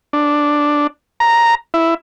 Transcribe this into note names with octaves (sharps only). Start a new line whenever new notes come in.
D4
A#5
E4